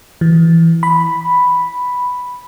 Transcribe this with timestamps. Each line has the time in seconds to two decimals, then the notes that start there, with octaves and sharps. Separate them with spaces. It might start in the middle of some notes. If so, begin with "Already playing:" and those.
0.21 E3
0.83 B5